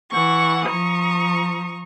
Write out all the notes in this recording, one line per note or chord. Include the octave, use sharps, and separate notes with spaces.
E3 F#5 C#6
F3 A#5 C#6 D#6